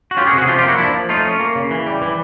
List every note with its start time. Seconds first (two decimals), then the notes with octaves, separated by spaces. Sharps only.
0.11 F#4
0.17 C#4 F4 G4
0.27 F#4 G#4
0.33 C3
0.38 F#4 G#4
0.47 F3 F4 G4
0.58 F4 G4
0.64 A#3 E4 F#4
0.78 F3 D4 E4
0.94 F3
1.09 A3 D#4 F4
1.25 C#4
1.40 A#3
1.56 C#3
1.71 E3
1.86 G3
2.02 E3